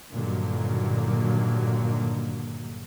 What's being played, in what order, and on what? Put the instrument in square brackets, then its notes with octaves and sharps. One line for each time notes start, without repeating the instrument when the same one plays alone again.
[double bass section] G2 A#2 D3 D#3 F#3 A#3